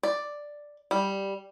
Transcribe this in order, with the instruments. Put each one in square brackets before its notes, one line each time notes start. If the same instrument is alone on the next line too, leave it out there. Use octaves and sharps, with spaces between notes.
[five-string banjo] D5
G3